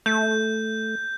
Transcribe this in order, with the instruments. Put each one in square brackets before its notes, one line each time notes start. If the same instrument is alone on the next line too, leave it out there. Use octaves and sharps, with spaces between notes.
[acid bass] A3 [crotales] G6